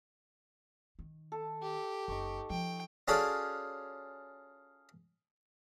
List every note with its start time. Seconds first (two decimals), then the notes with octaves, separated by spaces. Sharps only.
0.99 D#3
1.32 A4
1.62 G4
2.08 F#1 D#4 C#6
2.50 F3 G5
3.08 C#4 F4 F#4 G#4 A4 D5